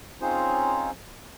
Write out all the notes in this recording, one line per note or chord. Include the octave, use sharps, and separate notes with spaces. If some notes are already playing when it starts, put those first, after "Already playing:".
C4 C#4 D#4 F4 G#4 C5